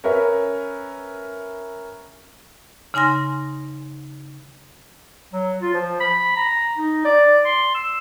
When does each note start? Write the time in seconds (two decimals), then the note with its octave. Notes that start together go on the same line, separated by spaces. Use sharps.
0.04 C#4 A#4 B4 E5
2.94 C#3 D#4 G#5 C6 A#6
5.33 F#3
5.62 F4
5.74 F3
6.01 B5
6.37 A#5
6.77 D#4
7.05 D5
7.45 C6
7.75 E6